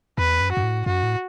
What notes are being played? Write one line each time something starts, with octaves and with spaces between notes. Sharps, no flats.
E2 B4
F#2
F#2 F#4
A2
F#2 F#4
A2